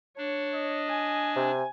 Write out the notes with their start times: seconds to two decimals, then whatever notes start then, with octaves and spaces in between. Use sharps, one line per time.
0.18 D4 C#5
0.54 D#5
0.89 G#5
1.36 C3